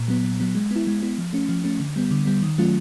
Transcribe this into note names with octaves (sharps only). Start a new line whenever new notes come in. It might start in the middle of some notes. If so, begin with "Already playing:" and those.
Already playing: A#2
F#3 B3
A#2
F#3 B3
G#3
B3 E4
G#3
B3 E4
F3
A3 C#4
F3
A3 C#4
D3
G3 B3
D3
G3 B3
D#3
F#3 A3 C#4 F4